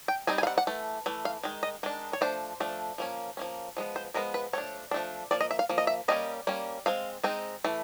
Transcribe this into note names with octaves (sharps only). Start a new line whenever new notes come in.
G5
G3 C4 D#4 G#5
G#5
F5
F#5
F#5
E3 A3
E3 A3
F5
D#3 G#3
D#5
D#3 G#3 D4
C#5
F3 A3 D4 C5
F3 A3 D4
F3 A#3 C#4
F3 A#3 C#4
F3 G#3 B3
C5
F3 G#3 B3 A#4
B4
F3 A3 D4 C#5
F3 A3 D4
F3 A#3 D5
D#5
E5
F5
F3 A#3
D#5
E5
G3 A#3 C#4 D#5
G3 A#3 C#4
G#3 C4 F5
G#3 C4 D#4
E3 A3